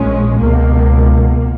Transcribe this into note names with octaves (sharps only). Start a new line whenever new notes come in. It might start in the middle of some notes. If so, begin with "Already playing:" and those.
Already playing: A#1 A#2 G#3 C#4
C#2 B2 A#3